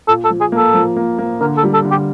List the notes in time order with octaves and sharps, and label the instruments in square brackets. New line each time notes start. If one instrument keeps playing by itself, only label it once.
[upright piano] A#2 [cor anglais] A4
[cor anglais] A4
[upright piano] F3
[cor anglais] G#4
[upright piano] A#3
[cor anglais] A4
[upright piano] F3
A#3
A#3
[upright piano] D3 [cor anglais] A#4
[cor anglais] A4
[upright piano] G3
[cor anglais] A4
[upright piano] D3
[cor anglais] G4